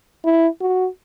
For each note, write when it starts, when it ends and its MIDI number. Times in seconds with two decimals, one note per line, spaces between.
0.25 0.47 64
0.61 0.88 66